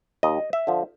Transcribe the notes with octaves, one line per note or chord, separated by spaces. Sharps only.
D#2 D#5
E5
D3 F3